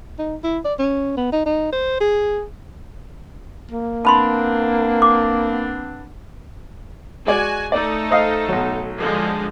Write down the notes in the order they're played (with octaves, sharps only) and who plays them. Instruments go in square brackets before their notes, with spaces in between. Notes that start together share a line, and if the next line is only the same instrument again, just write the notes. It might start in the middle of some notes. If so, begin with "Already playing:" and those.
[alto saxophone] D#4
E4
D5
C#4
B3
D#4
D#4
C5
G#4
A#3
[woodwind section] B3 C4 D4 [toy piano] A5 B5 C6
[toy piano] D6
[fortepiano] G#3 D5 [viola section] F#4 G#5
[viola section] A3 D#4 A4 [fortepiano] D5
[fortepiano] C5 D#5 F5
B1 F#3
[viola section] D3 F3 G#3